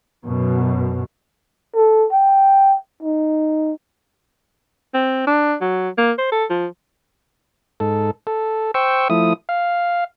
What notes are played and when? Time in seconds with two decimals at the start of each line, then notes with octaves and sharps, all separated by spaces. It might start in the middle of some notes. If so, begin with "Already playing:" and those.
0.25 F#2 B2
1.75 A4
2.12 G5
3.03 D#4
4.94 C4
5.27 D4
5.61 F#3
5.98 A#3
6.18 C5
6.32 A4
6.50 F3
7.80 G#2 A4
8.27 A4
8.74 C5 G5 C#6 E6
9.10 F3 A3 E4 D#6
9.49 F5